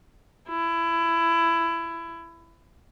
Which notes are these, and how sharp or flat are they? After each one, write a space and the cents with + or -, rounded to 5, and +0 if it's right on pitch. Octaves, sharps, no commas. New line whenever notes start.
E4 +20